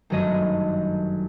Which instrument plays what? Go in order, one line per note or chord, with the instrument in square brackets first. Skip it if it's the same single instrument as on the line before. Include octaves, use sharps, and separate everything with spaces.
[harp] G1 F#2 D#3 F#3 A3 D#5